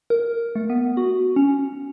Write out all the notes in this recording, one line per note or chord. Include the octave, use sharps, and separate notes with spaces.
A#4
A3
B3
F#4
C#4